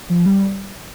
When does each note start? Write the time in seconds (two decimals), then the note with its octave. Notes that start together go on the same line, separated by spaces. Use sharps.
0.10 F3
0.26 G3